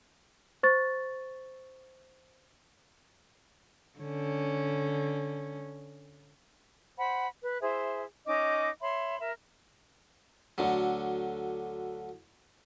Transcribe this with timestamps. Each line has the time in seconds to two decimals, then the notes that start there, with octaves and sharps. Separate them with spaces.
0.63 C5 C#6 A6
3.99 D3 C#4
6.99 C5 F#5 B5
7.42 B4
7.61 E4 G#4 C5 E5
8.26 C#4 D#4 D#5 D6
8.81 C#5 E5 B5 C6
9.20 A#4 E5
10.58 D2 D3 F#3